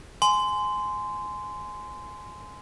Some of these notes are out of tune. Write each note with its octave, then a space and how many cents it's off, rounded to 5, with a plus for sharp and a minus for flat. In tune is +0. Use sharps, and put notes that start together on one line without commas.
G#5 +15 C6 -15